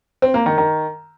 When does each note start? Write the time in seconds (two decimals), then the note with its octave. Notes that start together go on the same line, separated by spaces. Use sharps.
0.22 C4
0.34 A#3
0.46 D#3
0.58 D#3